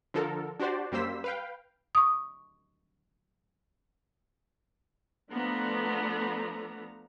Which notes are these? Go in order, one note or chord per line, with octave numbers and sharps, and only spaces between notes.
D3 F3 A4 A#4
D4 F#4 G4 C5 D5
F#2 G3 A#3 C5 E6 B6
B4 F5 G5
C#6 D#6
F3 A3 B3 D4 A4 A#5